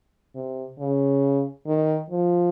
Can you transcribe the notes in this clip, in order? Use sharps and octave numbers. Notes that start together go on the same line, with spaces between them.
C3
C#3
D#3
F3